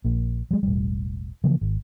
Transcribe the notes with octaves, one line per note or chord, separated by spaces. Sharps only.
A#1 A#3
F#3 G#3
E1 A1 G3
C#3 E3 F3 A#3
G#1